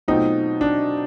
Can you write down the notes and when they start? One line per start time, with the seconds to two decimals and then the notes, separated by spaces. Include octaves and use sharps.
0.08 B2 F#3 A3 C4 D#4 F4
0.61 D4